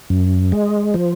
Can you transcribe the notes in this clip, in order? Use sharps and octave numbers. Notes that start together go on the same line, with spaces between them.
F#2
G#3
F3